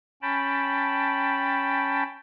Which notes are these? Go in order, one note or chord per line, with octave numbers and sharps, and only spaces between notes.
C#4 G5 A5 B5